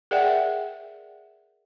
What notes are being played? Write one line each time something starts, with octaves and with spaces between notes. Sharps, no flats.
G#4 A#4 D5 E5 F#5 G5